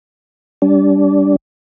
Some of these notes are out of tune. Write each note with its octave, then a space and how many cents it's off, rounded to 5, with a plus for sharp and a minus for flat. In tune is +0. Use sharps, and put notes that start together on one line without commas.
G3 +0 D4 -25